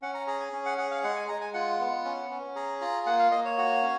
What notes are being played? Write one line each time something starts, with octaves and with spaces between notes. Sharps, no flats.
C#4 F#5
A#5
G#4 A#5
G#5
C#4
F#5
G#4 F#5
F5
G#3 F#5
G#5
G#3 A#5
G#5
F4 F#5
B3
C#4
C#4
G#4 A#5
F4 A#5
A#3 F#5
F5
A#3 D#5
C#5
F#4
C#4